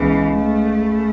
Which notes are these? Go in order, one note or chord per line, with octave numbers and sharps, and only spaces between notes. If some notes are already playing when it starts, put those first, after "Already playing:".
Already playing: C#2 E3 B3
A3